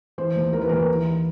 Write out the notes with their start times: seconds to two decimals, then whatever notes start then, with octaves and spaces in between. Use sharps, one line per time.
0.18 E3 C5
0.36 D#2
0.53 E3 A#4
0.62 B4
0.69 D#2 A#4
0.88 E3